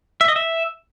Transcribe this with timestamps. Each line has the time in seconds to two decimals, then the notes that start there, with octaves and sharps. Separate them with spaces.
0.21 E5
0.28 D#5
0.36 E5